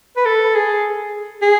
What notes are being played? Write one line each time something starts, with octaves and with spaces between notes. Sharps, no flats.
B4
A4
G#4
G#4